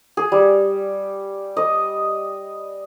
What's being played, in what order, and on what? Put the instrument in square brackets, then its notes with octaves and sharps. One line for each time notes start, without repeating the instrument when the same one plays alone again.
[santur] G#4
G3
D#5